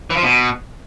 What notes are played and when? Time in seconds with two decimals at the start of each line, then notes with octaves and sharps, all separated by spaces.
0.10 E3
0.17 F3
0.23 B2